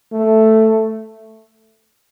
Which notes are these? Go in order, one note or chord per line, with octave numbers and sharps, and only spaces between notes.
A3